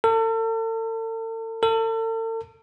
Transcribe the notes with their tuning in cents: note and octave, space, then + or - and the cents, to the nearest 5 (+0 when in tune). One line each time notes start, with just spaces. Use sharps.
A4 +40
A4 +40